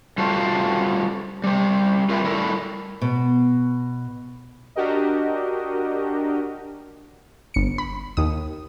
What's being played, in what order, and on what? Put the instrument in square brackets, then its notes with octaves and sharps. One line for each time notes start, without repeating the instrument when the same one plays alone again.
[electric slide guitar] G3 F4 F#4 A4 C5
G3 C5
F4 A#4 B4 E5 F5 G5
G3 E4 A4 A#4
[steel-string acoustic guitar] B2
[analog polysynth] D4 F#4 G4 A#4 D#5
[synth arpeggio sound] G1 C#7
B5
D#2 D#6